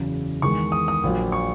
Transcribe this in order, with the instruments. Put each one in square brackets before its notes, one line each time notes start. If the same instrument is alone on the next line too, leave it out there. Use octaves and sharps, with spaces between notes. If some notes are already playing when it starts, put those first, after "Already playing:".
Already playing: [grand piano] F#1 E2 C#3 F#3
E2 D#3 G#3 C#6
D#6
D#6
A#1 A#2 F#3
C#6